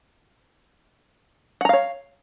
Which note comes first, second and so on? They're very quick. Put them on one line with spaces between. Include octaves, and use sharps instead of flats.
F#5 A#5 F5 C#5